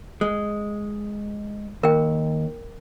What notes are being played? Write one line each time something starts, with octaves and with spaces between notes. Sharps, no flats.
G#3
D#2 A#4 G5